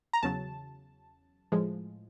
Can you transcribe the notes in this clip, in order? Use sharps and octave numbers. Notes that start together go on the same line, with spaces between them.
A#5
E2 C#3 F#3 A5
A2 F3 G#3